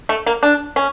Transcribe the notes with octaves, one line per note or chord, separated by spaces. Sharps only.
A3
A#3
D4
C#4